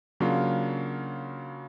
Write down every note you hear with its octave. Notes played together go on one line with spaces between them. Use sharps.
C#3 F#3 A#3 D4 F4